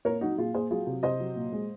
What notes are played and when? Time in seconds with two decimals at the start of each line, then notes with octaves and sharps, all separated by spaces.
0.05 A#2 A#4 C#5
0.21 F#3 D#4 F#4
0.38 A#2 F4 G#4
0.54 A#2 G#4 C5
0.71 F#3 F4 G#4
0.87 C3
1.03 C3 C5 D#5
1.20 F#3
1.36 A#2
1.53 G#3